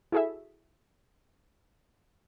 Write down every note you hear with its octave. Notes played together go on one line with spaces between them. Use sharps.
E4 F#4 G#4 A4 E5